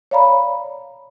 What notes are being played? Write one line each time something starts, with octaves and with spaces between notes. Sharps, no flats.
C#5 D5 F5 A#5 B5